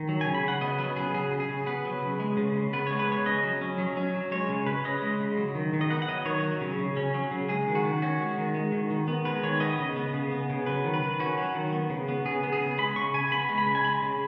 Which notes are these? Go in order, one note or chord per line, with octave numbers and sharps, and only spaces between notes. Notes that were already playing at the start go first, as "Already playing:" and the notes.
Already playing: D#3
F#3
C#3 G#5
B5
C#3 F#5
B3 D#5
F#3 B4
C#3 G#4
F#3 G#4
C#3
G#4
C#3
B3 B4
F#3
C#3
G#3
C#3
C#3
B3 B4
G#3 C#5
B4
C#3 C#5
C#4 D#5
F#3
C#4
F#3
C#4
F#3
G#3 C#5
C#3
C#3 B4
C#4 D#5
G#3
C#3
F#3
D#3
D#3
D#5
B3 F#5
F#5
F#3 D#5
D#3 C#5
F#3
C#3
C#3
C#4
F#3
C#3
G#3 G#4
D#3
F#4
D#3
C#4 F#4
G#3
D#3
G#3
D#3
D#3
B3
G#3 B4
D#3 C#5
B3 D#5
C#3
B3
C#3
B3
C#3
F#3 B4
D#3
B4
D#3
C#4 F#4
F#3
D#3
B3
C#3
B3
C#3 G#4
B3
G#4
C#3
G#3 B5
C#3 C#6
C#3 G#5
B3 B5
G#3
B5
C#3
G#5
G#3 B5
C#3